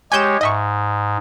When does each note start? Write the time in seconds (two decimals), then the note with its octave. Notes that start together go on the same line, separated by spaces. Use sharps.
0.12 G#3 G4 C#5 G#5 G6 E7
0.41 G#2 D#5 E5 C#6